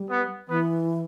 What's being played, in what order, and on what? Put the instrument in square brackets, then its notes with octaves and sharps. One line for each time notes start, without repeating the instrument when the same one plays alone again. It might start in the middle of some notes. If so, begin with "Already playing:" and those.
Already playing: [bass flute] G3
[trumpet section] B3
[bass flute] E3 [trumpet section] B3